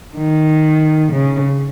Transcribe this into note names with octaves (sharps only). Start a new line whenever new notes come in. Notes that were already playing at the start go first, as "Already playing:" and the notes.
D#3
C#3